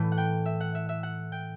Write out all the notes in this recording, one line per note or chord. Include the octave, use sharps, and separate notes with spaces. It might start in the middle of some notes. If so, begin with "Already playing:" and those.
Already playing: A2 E3 A3
F#5
G5
E5
F#5
E5
E5
F#5
G5